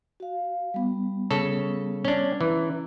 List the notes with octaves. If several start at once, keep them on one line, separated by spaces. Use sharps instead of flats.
F#4 F5
G3 B3
C#3 A4
C#4 D4
E3 C#4 A#5